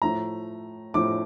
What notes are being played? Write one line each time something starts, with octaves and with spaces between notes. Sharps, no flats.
A2 F3 A3 A#5
A2 F3 A3 D6